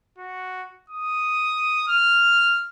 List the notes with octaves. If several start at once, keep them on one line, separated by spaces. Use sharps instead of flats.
F#4
D#6
F6